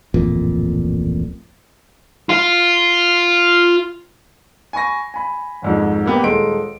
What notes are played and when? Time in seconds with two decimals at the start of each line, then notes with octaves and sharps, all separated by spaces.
0.14 D1 A1 F2 A#2
2.29 F4 F5
4.73 G#5 B5 C#6 A#6
5.14 G#5 B5
5.62 G#1 F2 G#2
6.06 A#3 B3 G4 B4
6.23 D#1 G#3 D#4 A4 C6 D7